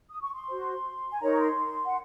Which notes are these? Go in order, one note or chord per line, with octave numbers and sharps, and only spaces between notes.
D#6
C#6
C6
F#4 C5
G#5
D#4 A#4 C#5 A#5
C#6
C6
F#5